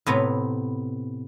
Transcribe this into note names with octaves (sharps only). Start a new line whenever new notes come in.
A2 C3 B3 A#5